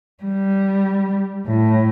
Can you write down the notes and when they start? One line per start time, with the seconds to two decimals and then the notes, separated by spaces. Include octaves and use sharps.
0.24 G3
1.46 A2